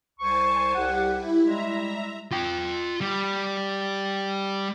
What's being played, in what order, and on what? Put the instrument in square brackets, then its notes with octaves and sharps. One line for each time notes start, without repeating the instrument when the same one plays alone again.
[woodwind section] C2 C#6 [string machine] C5 G#5 A5
[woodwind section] C2 F#5 [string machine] G4
[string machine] E4
[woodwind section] G3 G#3 [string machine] E5 A#5
[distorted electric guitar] F4 G5
G3